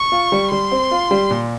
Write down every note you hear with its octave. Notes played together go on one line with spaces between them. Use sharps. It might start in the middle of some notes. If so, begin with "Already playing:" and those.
Already playing: C#6
F4
G3
G3 C6
C4
F4
G3
A#2